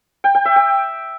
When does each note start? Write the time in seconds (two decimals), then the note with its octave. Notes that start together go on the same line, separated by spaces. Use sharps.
0.24 G5
0.35 G5
0.45 E5
0.56 G5